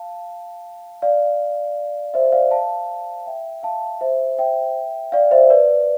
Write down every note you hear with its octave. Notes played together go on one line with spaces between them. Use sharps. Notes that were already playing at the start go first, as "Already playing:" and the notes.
Already playing: F5 A5
D5 F5
C5 E5
E5
D5 F5
F5 A5
E5 G5
F5 A5
C5 E5
E5 G5
D5 F5
C5 E5
B4 D5